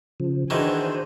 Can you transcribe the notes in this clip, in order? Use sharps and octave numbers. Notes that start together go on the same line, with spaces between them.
C#3 F3
D#3 E3 D4 F#4 G#4 C5